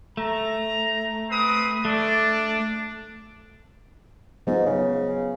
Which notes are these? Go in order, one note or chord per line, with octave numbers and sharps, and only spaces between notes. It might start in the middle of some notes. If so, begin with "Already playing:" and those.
A3 A#5
C4 B4 D#6
A3 D4
G#2 F#3 B3 F4
C#3